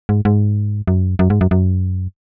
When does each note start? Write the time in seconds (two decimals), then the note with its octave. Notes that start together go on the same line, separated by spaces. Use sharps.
0.09 G#2
0.25 G#2
0.87 F#2
1.19 F#2
1.30 G#2
1.41 F#2
1.51 F#2